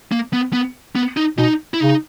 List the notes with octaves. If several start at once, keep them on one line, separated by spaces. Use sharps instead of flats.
A#3
B3
B3
B3
D#4
B2 D#4
E4
C#3 D#4